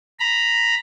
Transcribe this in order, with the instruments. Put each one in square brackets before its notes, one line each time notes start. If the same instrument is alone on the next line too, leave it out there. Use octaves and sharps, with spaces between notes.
[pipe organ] A#5 B5